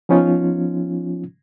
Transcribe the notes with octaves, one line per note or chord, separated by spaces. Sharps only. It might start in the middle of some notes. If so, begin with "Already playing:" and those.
F3 B3 C#4 D#4 F4